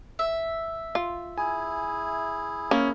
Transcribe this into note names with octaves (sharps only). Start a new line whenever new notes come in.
E5
F4
E4 G#4 G#5
A#3 C#4